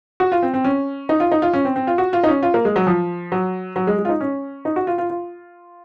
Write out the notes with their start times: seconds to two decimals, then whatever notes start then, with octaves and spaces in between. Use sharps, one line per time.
0.20 F#4
0.32 F4
0.42 C4
0.54 C4
0.64 C#4
1.09 D#4
1.20 F4
1.31 D#4
1.42 F4
1.53 C#4
1.65 C4
1.76 C4
1.87 F4
1.98 F#4
2.13 F4
2.23 D#4
2.28 C#4
2.43 F4
2.54 A#3
2.65 G#3
2.76 F#3
2.87 F3
3.32 F#3
3.76 F#3
3.87 G#3
3.99 G#3
4.05 F4
4.09 D#4
4.20 C#4
4.65 D#4
4.76 F#4
4.87 F4
4.98 F4
5.10 F4